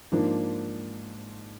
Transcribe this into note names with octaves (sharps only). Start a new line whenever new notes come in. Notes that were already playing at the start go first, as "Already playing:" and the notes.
G#2 F3 A#3 D4